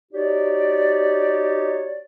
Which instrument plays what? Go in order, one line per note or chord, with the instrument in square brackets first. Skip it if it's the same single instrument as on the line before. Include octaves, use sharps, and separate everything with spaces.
[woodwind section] D#4 F#4 G4 C#5 D5